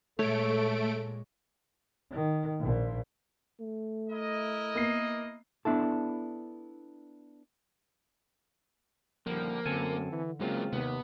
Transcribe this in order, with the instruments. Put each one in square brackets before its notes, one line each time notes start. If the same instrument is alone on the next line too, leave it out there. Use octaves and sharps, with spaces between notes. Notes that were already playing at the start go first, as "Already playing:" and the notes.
[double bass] A#2 G#3 [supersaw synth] A3 D7 [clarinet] A4 [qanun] C#5
[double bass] D#3
A#1 A#2
[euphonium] A3
[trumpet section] E4 A#4 D#5
[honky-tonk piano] A#3 B3 C7
[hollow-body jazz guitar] B3 D4 E4 A4
[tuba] D#1 [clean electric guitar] D3 G3 [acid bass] F3 [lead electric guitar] A#3
[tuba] F#2 [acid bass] D3 [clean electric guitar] C4 A4 G#5
[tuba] E3
[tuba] C#3 [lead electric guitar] F#3 A#3 [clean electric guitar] G#3 C4 F4
[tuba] D#2 [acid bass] C3 [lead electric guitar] B3